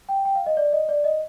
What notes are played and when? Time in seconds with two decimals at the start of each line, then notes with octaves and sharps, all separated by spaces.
0.09 G5
0.25 G5
0.35 F5
0.46 D#5
0.57 D5
0.73 D#5
0.89 D5
1.04 D#5